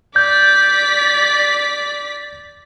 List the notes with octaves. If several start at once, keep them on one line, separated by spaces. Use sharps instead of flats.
D5 G6 B6